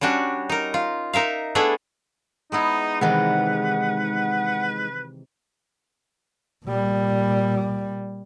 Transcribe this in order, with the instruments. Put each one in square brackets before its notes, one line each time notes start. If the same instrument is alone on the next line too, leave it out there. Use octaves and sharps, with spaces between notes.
[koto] G3 C#4 D4 F#4
D#4 A#4
F4
D#4 A#4 E5 F5
A3 B3 D4 E4 G#4 A4
[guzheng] G#3 B3 E4 [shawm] D#4
[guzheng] C3 D#3 E3 [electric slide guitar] G#3 D#4 [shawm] B4 [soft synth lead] F#5
[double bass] A#2 G3